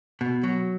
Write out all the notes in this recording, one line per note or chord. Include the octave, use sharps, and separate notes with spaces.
B2
F#3